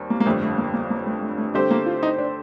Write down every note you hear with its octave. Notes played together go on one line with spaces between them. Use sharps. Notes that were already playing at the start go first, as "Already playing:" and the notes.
Already playing: D#2 D#3 G3 C4
A#3
A#3
G1 F2 D3 G3 A3
A3
A#3
A#3
A#3
A3
A3
A3
D3 G3 A3 C4 G4 C5
A#3
F4
D#4
D4